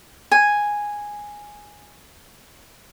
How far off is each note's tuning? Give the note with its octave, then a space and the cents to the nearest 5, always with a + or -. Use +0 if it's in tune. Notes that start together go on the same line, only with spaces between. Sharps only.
G#5 -5